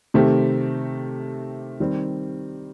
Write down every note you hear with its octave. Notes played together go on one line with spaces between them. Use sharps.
C3 D#3 A3 C4 G4
D#3 G3 C4